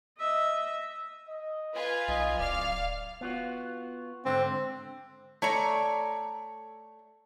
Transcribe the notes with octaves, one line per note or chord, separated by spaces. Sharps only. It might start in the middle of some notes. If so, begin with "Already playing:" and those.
D#5 E5
D#5
F4 B4 G#5
B1 D#5
D1 D5 F5 F6
B3 F4 F#4
G#2 D3 C4
A3 C#5 D5 A#5